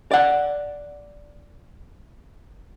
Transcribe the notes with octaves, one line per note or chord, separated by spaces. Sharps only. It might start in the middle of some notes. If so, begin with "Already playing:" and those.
D5 F#5